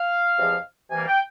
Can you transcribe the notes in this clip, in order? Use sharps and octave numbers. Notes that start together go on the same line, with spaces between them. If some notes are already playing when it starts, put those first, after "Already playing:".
Already playing: F5
E2 C3 F3 G#3
C3 E3 G3 A#3 G#5
G5